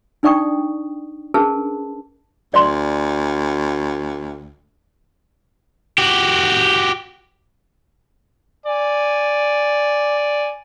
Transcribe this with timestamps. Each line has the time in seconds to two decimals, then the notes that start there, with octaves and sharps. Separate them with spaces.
0.23 D4 D#4 D5 G5 C#6 D#6
1.34 C#4 D4 G#4 A#4 B4 A5
2.54 D2 D5 C6
5.98 F#4 G4
8.66 D5 G#5